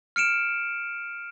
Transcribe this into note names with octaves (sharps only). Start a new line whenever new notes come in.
F6 C#7 D7 E7